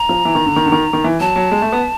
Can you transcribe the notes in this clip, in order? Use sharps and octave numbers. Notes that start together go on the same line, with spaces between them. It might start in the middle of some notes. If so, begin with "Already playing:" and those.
Already playing: A#5
F3
E3
D#3
D3
D#3
D3
D#3
D#3
E3
F#3 A5
F#3
G#3
A3
B3